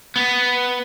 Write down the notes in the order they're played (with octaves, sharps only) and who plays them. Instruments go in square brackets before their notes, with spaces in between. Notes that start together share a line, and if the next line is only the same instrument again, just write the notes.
[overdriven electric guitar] B3